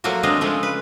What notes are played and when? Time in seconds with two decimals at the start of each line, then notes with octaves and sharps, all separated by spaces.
0.04 F3 F#3 A3 A#3 F#4
0.23 G#3 C4 D4 D#5 F5
0.41 C#3 F3 G#3 A3
0.63 B4